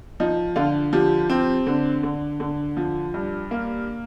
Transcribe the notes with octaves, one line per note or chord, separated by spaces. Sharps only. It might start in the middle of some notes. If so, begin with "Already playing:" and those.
F3 D#4
D3 F4
F3 G4
C4
D3
D3
D3
F3
G2
A#3